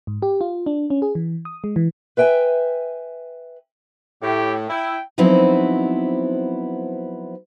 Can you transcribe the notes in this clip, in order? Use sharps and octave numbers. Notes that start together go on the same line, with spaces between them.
G#2
G4
F4
D4
C#4
G#4
E3
D#6
G#3
E3
B4 E5 G5 G#5
A2 G4
E4 G5
F3 F#3 B3 C4 D#4 E4